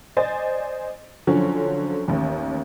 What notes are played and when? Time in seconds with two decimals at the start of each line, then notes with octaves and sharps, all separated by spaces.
0.17 C5 D5 D#5 G#5 A6
1.27 D3 F3 F#3 C#4
2.08 A1 D#2